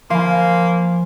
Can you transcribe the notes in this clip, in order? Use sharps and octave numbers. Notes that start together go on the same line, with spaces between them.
F3 A#3 F5 G#5 B5 C6